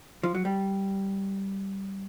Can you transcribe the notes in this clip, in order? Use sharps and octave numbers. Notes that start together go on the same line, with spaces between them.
F3
F#3
G3